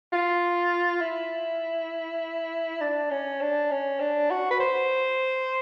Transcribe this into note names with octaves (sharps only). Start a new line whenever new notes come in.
F4
E4
D4
C#4
D4
C#4
D4
F#4
B4
C5